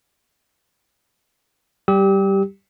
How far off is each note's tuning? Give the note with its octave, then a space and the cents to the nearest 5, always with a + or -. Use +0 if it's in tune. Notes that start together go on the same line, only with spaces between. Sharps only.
G3 -15 G4 +0 E6 -45